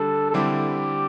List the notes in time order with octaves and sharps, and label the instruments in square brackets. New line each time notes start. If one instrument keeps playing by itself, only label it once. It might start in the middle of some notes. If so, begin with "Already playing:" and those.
Already playing: [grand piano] D3 G3 D4 [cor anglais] A4
[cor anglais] A4
[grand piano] D3 G3 C4 E4 [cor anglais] G4